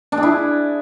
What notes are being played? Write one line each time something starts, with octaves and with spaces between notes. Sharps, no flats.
D4
G#4
E4